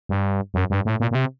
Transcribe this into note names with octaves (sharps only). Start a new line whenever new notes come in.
G2
F#2
G2
A2
A#2
A#2
C3